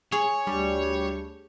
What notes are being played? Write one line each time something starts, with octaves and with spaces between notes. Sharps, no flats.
G#4 C#5
D2 G3 D4 G4